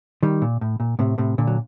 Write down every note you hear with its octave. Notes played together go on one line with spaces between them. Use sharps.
D#3 G3
A#2
A2
A#2
A2 C3
A2 C3
A#2 D3
F#3